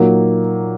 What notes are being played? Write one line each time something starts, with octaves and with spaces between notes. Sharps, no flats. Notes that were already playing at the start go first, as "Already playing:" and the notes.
Already playing: A#2 F#3 A#3 D#4